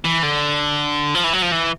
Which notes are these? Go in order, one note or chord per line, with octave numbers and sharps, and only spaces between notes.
E3
D3
F3
E3
F#3
F3
E3